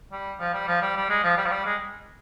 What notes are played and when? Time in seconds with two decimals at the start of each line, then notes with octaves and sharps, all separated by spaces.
0.12 G3
0.40 F3
0.54 G3
0.68 F3
0.82 G3
0.96 G3
1.09 G#3
1.24 F3
1.37 G3
1.45 F3
1.52 G3
1.65 G#3